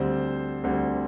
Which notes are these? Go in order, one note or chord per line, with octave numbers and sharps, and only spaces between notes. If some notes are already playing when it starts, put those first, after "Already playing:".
Already playing: D2 D3 G3 C4 C5
D2 D3 G3 C4